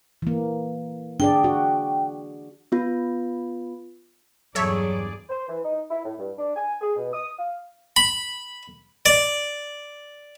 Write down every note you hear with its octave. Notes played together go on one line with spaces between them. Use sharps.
E3 A#3
D4 G#4 D5 G5
F#4
B3 F4
E2 G2 F#3 G#4 A4 C#5 D5 E5
C5
E3
D#4
E4
A2
G2
D4
G#5
G#4
B2
D#6
F5
B5
D5